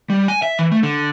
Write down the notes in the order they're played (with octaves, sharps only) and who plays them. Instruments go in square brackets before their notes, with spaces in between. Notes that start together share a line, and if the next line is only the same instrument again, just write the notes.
[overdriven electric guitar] G3
G#5
E5
E3
A3
D3